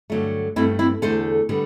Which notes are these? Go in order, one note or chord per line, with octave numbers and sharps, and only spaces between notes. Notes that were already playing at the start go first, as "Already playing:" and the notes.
G2 D3 F#3 A3
G2 F#3 A3 C4 E4
C4 E4
E2 D3 A3 A4 C5
D3 G3 B3